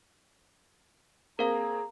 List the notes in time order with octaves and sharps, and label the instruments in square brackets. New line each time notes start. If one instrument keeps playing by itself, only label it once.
[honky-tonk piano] A#3 C4 [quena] G#4 [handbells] A#4 F5 [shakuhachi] A#5